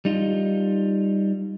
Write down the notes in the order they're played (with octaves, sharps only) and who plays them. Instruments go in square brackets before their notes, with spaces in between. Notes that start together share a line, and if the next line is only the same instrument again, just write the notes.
[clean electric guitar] G3 D#4 F4